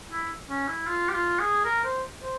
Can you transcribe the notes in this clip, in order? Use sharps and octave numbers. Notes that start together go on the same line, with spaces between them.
E4
C#4
E4
F4
G4
F4
G#4
A#4
C5
C5